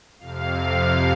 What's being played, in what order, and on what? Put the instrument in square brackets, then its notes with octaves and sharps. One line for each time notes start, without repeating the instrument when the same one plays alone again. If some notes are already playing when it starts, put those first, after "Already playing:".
[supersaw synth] F2 C3 F5